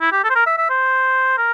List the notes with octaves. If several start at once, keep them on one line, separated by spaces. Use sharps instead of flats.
E4
G4
A4
C5
A#4
E5
E5
C5
A#4